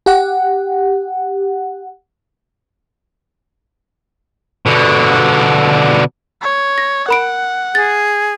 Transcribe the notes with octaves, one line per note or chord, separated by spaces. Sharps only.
G4 F#5
B2 D3
C#5
A#6
A#4 F#5 B5 D7
G#4 A6